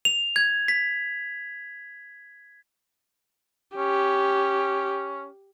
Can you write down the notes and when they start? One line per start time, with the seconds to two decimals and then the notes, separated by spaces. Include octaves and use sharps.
0.05 F7
0.36 G#6
0.68 B6
3.77 C#4 G4